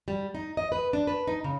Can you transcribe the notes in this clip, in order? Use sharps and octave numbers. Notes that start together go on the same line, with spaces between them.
G3
D#4
D#5
B4
D4
B4
D#4
C#3